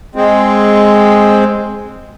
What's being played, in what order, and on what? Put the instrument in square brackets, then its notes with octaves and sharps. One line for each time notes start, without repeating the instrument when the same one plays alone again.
[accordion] G#3 C4